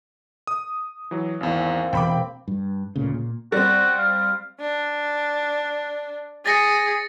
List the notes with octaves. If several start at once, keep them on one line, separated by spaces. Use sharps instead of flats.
D#6
E3 F#3
G#1 E2 A#3 C4
E1 G5 B5 D6
G2
D2 A#2 C#3
A#2
G3 C4 F#4
F5
D4
G#4 A6 A#6 C#7